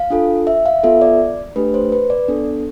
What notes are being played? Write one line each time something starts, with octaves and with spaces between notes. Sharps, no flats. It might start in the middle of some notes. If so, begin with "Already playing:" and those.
Already playing: F5
D4 F4 A4
E5
F5
B3 F4 A4 E5
D5
A3 D4 G4 B4
C5
B4
D5
B3 D4 A4